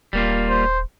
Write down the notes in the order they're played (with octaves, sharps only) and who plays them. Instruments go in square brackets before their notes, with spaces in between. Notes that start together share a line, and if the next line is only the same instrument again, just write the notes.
[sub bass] D#1 [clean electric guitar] G3 A#3 F4
[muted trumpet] C5